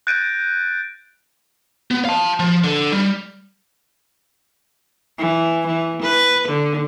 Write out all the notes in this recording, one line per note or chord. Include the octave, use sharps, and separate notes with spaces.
F#6 G6 A6 A#6 D7 D#7
B3
F5 A5
F3
D3
G3
E3
E3
B4
D3